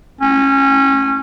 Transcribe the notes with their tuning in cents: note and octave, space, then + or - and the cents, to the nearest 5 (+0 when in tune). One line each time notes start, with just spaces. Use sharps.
C#4 -20